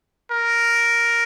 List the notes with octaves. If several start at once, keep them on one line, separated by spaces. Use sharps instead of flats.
A#4